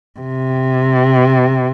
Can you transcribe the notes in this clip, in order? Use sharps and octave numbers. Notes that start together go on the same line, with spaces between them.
C3